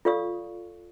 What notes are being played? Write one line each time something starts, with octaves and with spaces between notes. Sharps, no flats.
F4 A4 D5 F5 C#6 D#6